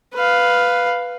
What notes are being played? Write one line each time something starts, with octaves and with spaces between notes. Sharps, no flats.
B4 F5